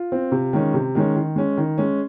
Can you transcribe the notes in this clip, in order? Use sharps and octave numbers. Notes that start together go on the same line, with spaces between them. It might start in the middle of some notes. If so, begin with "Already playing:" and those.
Already playing: F4
C4
C3
D#3 G#3 C#4
C3
D#3 G#3 C#4
D#3
G#3 C#4
D#3
G#3 C#4